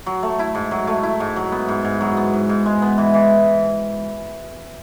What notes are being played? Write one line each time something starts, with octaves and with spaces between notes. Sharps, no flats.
F#3
A3
E4
G#2
F#3
A3
E4
G#2
F#3
B3
G#2
G#2
F#3
B3
G#2
G#2
G#3
B3
E3
E3